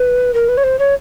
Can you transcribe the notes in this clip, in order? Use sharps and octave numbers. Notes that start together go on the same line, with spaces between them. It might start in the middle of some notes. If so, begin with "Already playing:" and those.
Already playing: B4
A#4
B4
C#5
C5
C#5